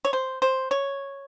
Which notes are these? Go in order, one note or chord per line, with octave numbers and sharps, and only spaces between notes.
C#5
C5
C5
C#5